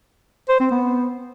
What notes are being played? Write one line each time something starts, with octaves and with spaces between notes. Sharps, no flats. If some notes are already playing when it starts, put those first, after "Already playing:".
C5
C4
B3